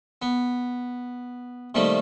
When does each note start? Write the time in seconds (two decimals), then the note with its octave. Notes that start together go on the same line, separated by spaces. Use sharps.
0.22 B3
1.75 C3 D#3 G3 A3 A#3